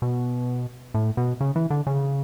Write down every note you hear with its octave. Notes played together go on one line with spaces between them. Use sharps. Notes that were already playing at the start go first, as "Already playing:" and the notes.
B2
A2
B2
C#3
E3
D3
C#3